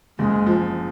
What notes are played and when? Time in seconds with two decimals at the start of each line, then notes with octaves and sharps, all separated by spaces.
0.18 F#1 G#3
0.47 F3